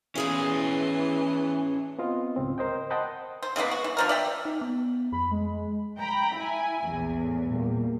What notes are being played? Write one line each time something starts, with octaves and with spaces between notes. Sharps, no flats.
E2 E3 C#4 E4 G#4 F5
B3 C4 F4 D#5
C#2 G#2 C4
A#4 C5 D#5 G5
D#5 F#5 G5 A5 B5 C6
C5
C#3 G#3 A#3 B3
F#4
E3
D3 F3 A#4
D5 E5 G5
D#4
B3
F2 B5
G#3
G5 A#5 B5
E4 G#5
A#1 E2
A2
A#2 G3 A#3